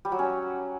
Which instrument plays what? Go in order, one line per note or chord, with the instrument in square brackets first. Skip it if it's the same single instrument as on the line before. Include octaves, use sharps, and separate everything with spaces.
[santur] G3
F#3
C#4